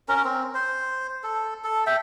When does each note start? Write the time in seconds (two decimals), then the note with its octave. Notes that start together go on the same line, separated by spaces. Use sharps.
0.08 C#4 A#4
0.24 C4
0.54 C5
1.23 A4
1.64 A4
1.87 E5 G5